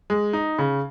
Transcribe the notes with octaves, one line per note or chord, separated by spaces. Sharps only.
G#3
D#4
C#3